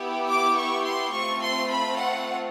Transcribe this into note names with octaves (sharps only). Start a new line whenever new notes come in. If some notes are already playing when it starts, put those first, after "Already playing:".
Already playing: B3 E4 G4
D6
C#6
C6
A3 C4 F4 C#6
C6
B5
F#5